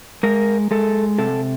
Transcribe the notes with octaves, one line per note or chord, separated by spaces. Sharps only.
G#3 A#4
G#3 A4
C3 A4